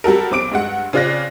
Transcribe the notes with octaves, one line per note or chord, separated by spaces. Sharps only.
G3 F#4 A4 A#4
B1 C4 D6 D7
G2 G#3 F#5
C#3 C4 F4 D5 F#6 A#6